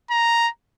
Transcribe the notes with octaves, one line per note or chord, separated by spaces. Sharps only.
A#5